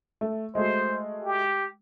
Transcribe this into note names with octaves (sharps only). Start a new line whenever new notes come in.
A3
G#3 A3 F#4 C5
G4